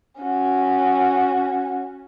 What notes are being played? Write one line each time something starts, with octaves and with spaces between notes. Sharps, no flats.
C#4 F#4